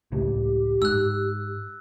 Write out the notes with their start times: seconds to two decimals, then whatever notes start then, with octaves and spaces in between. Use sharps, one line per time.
0.12 C#2 A2 G4
0.82 G#2 E6 F#6